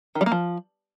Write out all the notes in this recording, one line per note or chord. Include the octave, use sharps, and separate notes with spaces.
D#3
G3
A#3
F3